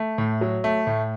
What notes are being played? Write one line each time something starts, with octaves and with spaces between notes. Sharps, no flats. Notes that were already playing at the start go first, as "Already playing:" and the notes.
Already playing: A3
A2
F#3
A3
A2